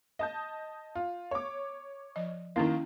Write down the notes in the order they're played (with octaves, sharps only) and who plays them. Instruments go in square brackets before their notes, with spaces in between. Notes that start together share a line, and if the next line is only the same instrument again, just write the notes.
[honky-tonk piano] D#5 A5 G6
F4
C#5 D6
[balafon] F3 D#5
[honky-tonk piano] D#3 A#3 [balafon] C#4 E4